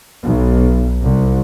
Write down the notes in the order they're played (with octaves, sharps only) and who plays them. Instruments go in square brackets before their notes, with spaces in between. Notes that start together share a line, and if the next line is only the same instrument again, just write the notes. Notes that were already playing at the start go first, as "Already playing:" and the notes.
[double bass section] B1
C2